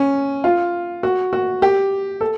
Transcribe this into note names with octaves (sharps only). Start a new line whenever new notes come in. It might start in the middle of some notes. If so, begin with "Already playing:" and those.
Already playing: C#4
F4
F#4
F#4
G4
A4